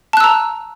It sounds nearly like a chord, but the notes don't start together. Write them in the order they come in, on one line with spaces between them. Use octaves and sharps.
A5 F#6 E6 A#5